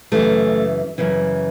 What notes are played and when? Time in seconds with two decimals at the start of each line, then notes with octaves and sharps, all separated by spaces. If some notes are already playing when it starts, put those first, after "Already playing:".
0.12 F#2 C#3 E3 A3
0.98 F#2 C#3 E3